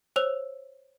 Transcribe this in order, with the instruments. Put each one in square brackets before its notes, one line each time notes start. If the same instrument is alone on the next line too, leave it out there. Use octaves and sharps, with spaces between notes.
[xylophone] C5 C#5 E6 F7